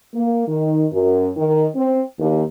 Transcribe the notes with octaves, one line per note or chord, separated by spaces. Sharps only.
A#3
D#3
F#2
D#3
C4
D#2